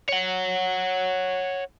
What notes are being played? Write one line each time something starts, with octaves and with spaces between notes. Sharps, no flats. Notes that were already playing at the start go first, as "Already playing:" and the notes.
C#5 F#5